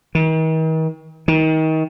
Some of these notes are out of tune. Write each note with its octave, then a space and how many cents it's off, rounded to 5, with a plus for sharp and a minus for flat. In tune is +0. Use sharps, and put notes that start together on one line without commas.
D#3 +45
D#3 +30